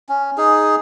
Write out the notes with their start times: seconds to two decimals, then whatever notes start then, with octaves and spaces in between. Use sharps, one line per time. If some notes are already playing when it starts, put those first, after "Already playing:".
0.09 C#4
0.38 D#4 G#4